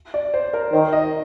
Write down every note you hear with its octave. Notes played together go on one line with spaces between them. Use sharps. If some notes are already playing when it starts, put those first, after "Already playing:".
D5
C5
A#4
D#3 C5
D#5